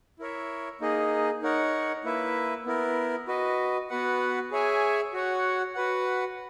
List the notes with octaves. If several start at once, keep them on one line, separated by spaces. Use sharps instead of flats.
E4 A#4 C#5 E5
A#3 D#4 G#4 D#5
D#4 A#4 C#5 F#5
A#3 E4 B4 E5
B3 E4 A#4
F#4 B4 D#5
B3 F#4 B4 F#5
G#4 C#5 E5 G#5
F#4 C#5 F#5
F#4 B4 F#5